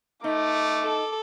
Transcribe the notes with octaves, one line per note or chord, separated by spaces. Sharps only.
A3 D#4 D6
A4